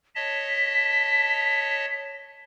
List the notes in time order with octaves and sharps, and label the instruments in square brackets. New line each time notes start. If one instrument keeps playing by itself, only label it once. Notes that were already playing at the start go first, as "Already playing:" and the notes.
[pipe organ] C#5 D#5 A5 [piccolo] B6